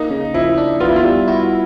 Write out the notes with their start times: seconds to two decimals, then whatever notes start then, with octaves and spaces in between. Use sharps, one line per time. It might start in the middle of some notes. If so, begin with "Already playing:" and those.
Already playing: A#3 D#4
0.10 C#3
0.34 F3 E4
0.58 D4
0.80 B3 F4
0.89 E4
0.96 F4
1.04 G3
1.28 E4 F#4